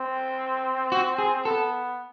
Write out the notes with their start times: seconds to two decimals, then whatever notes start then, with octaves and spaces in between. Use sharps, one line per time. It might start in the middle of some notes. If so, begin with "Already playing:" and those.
Already playing: C4
0.92 F#4
1.18 G#4
1.45 B3 A4